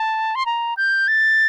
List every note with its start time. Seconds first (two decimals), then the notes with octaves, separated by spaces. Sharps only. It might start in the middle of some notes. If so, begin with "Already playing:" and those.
Already playing: A5
0.35 C6
0.46 A#5
0.77 G6
1.08 A6